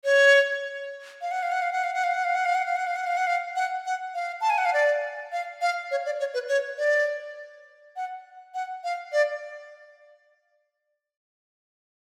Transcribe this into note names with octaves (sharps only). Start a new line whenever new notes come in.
C#5
F5
F#5
F5
F#5
F5
F#5
F5
F#5
F5
F#5
F5
F#5
F5
F#5
F5
F#5
F5
F#5
F5
F#5
F5
F#5
F#5
F5
A5
G#5
F#5
F5
D5
F5
F5
C#5
D5
C#5
B4
C#5
D5
F#5
F#5
F5
D5